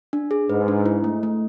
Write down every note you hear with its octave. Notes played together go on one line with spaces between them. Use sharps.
D4
G#4
G#2 B4
D4
E4
A3
A3